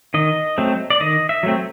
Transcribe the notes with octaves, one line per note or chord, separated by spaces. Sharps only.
D#3 D#5
F#3 A3 C4
D5
D#3 D#5
E5
F#3 A3 C4